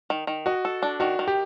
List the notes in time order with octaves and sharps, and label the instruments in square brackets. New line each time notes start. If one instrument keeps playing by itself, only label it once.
[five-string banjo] D#3
D#3
[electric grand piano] F#4 [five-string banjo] D#5
[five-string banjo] A4
D4
[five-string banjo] D#3 [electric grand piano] F#4
[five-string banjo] D#3
[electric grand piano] G4